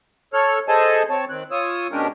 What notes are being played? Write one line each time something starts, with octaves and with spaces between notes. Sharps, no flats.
A4 C#5 F6
G#4 A4 C5 D#5 G#5 A5
C4 C#5 A5
D#3 C4 F#6
F4 C#5 D#6 E6
B2 G#3 C#4 D4 G4 A#4